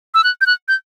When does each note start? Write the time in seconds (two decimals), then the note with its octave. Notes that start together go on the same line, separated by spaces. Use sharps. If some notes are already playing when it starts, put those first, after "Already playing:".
0.14 E6
0.24 F#6
0.41 G6
0.46 F#6
0.68 G6